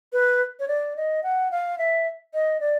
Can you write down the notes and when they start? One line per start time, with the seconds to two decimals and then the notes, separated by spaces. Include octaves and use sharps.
0.13 B4
0.60 C#5
0.68 D5
0.96 D#5
1.23 F#5
1.51 F5
1.78 E5
2.34 D#5
2.60 D5